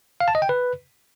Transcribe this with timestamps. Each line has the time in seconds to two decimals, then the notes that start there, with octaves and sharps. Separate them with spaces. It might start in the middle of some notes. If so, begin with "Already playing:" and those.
0.20 F5
0.28 A5
0.35 D#5
0.42 G5
0.49 B4